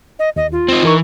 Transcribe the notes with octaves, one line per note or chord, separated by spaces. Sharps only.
D#5
D#2 D#5
F4
C4 D#4
E3 D#4 A#4 C#6